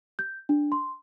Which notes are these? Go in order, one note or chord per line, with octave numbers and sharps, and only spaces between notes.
G6
D4
C6